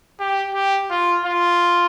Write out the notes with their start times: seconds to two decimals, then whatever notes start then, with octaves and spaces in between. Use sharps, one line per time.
0.20 G4
0.55 G4
0.90 F4
1.25 F4